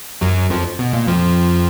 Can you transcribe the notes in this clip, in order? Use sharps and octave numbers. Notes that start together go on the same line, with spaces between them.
F#2 F#3
F2 F3
B2
A#2
F2 F3